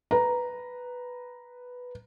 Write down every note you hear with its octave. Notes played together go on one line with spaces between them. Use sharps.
B4 A#5